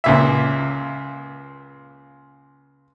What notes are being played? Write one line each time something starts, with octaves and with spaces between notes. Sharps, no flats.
C#2 A#2 E5